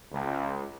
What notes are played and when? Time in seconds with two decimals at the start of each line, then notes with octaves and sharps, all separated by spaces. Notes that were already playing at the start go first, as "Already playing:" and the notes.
0.12 C#2